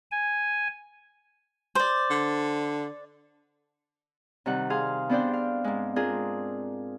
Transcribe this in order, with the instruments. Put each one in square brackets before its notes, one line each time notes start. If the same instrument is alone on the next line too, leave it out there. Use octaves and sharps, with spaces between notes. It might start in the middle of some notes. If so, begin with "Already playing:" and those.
[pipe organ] G#5
[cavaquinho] C5 D5
[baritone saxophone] D3
[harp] C3 D#3 G3 F#5
G#4 F5 C6
B3 C4 D4 C5 D5 G5
F5
G#2 G#3
C4 D4 F4 G#4 A#4